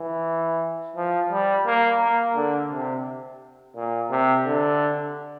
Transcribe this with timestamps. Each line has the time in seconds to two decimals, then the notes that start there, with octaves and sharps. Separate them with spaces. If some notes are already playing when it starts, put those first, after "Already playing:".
Already playing: E3
0.96 F3
1.31 G3
1.66 A#3
2.01 A#3
2.36 D3
2.71 C3
3.76 A#2
4.10 C3
4.45 D3